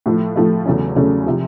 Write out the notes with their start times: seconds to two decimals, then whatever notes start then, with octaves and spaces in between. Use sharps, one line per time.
0.06 A2 F3 A3
0.36 A2 F3 A3
0.66 E2 C#3 F#3 A3 C#4
0.96 E2 C#3 F#3 A3 C#4
1.26 C3 F3